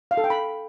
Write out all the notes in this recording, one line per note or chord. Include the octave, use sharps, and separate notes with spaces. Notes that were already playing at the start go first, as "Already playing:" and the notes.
F5
A4
G5
B5